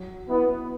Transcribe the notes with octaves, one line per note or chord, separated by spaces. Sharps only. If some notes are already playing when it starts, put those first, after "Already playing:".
Already playing: F#3
B3 E4